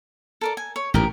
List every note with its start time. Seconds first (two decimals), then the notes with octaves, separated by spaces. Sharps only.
0.41 A4 A#4 D5
0.57 G#5
0.76 C#5
0.94 A1 G#2 G4 A#4